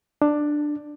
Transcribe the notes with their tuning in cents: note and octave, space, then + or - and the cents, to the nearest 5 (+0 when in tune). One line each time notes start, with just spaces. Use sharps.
D4 +10